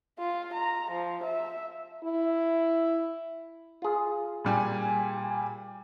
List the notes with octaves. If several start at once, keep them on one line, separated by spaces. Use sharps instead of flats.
F4
A#5
F3
E5
E4
F4 G#4
A#2 G3 G#5